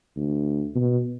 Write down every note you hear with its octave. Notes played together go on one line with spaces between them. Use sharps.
D2
B2